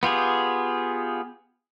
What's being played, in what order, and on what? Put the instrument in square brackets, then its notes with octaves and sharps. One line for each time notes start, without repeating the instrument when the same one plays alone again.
[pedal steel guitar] B3 F4 G4 G#4